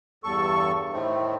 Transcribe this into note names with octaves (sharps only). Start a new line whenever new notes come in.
E2 G2 A4 C#6
A2 D#3 A3 C4